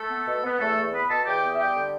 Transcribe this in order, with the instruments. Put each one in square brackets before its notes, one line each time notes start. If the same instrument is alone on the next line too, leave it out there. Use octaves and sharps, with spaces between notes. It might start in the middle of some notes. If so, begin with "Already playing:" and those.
Already playing: [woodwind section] A3 A4
B3
B2
B3
E2 A3 A4
E2
B3 B4 B5
B2 A4 A5
E2 G4 G5
B3
E5
G3 G4 G5
D3